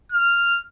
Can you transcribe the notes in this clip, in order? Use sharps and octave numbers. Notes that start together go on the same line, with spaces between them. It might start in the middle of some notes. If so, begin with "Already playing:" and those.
F6